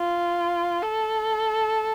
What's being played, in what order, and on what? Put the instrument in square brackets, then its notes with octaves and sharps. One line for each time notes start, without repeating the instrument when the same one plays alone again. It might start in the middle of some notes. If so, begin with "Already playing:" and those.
Already playing: [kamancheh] F4
A4